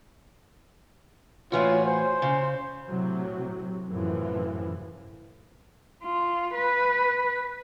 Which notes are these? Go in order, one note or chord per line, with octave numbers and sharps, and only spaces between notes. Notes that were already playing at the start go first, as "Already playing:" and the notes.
A2 E3 F4 F#4 C#5
C5 G#5
C#3
A2 C3 F#3
F#2 A2 C3 E3 F3
F4
B4